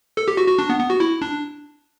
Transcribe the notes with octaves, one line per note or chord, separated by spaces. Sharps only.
A4
G4
F#4
F#4
D4
B3
B3
F#4
E4
D4